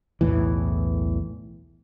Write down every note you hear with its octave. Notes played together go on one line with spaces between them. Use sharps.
B1 E2 A2 E3